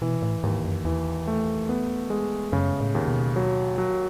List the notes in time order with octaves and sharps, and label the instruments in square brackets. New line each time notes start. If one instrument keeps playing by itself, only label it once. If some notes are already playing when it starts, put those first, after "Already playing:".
[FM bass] B2 [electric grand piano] E3
[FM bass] A2
[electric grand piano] D#2 [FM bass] G#2
[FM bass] F#2
[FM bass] E2 [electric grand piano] E3
[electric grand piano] A3
B3
G#3
[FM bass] F#2 [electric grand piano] C#3
[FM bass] A2
[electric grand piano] D#2
[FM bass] B2
[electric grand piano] F#3
F#3